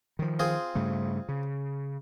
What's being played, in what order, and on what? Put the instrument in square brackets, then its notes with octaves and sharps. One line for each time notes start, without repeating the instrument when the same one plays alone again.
[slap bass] D#3 F3
[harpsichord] C4 F4 G#4
[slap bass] G2 C#3 A3
C#3